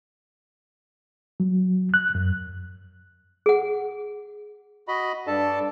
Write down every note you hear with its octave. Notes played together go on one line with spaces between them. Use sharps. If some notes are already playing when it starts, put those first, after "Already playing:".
F#3
F#6
F#2
G#4 F#5
F#4 D#5 B5
G2 D4 A4 A5